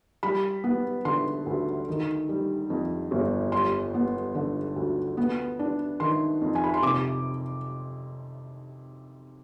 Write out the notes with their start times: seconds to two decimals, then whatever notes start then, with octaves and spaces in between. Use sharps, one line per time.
0.23 G3 B5
0.64 B3
1.05 D3 C6
1.46 D2
1.88 D#3
2.29 G3
2.70 F2
3.11 G1
3.52 G3 C6
3.94 B3
4.35 D3
4.76 D2
5.17 B3
5.59 D4
6.00 D#3 C6
6.42 F2
6.55 G#5
6.64 B5
6.74 C6
6.83 C3 D6